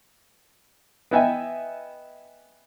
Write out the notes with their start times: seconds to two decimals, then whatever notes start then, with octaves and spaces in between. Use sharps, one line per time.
1.11 B3 B4 D#5 E5 G5 G#5